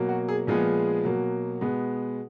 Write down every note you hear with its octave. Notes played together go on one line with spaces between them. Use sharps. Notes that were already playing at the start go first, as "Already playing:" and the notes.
Already playing: B2 F#3 A#3
F#4
G#4
A#2 F3 G#3 B3 G#4
B2 F#3 A#3
B2 G#3 B3